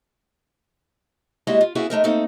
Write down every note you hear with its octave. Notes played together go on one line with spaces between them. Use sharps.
G3 G#3 A#3 E4 F#4 D#5
F4
A#3 B3 C#4 E4 F#4 G#4
G#3 A3 D#4 A#4
A3 A#3 C4 D#4 A4